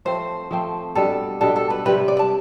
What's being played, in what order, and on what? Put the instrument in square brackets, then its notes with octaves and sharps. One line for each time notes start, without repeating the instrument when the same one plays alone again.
[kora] F3 A3 C4 [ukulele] C5
[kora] F3 A3 C4
[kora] B2 G3 D4 [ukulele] A4
[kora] B2 G3 D4 [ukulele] A4
[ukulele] A4
B4
[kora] C3 G3 C4 [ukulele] B4
[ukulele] D5
A5